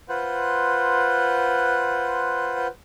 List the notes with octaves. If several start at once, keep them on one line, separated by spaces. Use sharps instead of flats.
F4 B4 C5 F#5